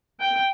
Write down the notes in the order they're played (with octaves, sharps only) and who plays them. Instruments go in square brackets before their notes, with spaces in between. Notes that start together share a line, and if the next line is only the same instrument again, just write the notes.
[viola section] G5